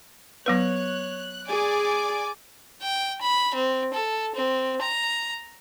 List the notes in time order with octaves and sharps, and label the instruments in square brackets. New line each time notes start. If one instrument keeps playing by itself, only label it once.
[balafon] F#3 B3 B4 [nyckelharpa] C#5 [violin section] F#6
[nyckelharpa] G#4 [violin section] D5 G#5 D6
[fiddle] G5
B5
C4
A4
C4
A#5